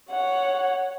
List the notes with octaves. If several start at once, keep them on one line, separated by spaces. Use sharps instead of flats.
C#5 F#5